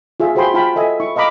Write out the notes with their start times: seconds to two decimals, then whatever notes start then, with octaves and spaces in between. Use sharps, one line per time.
0.20 F4 G#4 E5
0.35 F#4 G#4 C5 G5 B5 C6
0.54 E4 F4 F5 G5 A5 B5
0.76 A4 D#5 E5 G#5
1.00 E4 C#6
1.16 D#5 F5 A#5 B5 D6